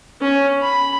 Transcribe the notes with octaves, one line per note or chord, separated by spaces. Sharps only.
C#4
B5